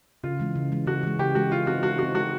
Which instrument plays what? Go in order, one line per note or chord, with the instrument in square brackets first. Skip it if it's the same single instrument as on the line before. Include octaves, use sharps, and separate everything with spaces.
[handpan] C#3 [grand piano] F4
[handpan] E3 G#3
C#3
E3 G#3
[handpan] C#3 [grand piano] F#4
[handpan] E3 G#3
[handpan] C#3 [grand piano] G4
[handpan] E3 G#3 [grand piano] F#4
[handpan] G#3 [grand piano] F4
[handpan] C4 D#4 [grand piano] F#4
[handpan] G#3 [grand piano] F#4
[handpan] C4 D#4 [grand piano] F#4
[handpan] G#3 [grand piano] F#4